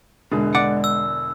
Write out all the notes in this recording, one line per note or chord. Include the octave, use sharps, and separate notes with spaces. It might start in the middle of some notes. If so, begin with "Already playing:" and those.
E1 D3 G#3 G#4
D5 F#5
E6